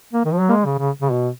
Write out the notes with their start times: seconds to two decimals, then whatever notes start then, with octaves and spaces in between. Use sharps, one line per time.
0.13 A#3
0.25 D#3
0.32 F3
0.40 F#3
0.49 A#3
0.52 G#3
0.65 C#3
0.78 C#3
1.01 C#3
1.11 B2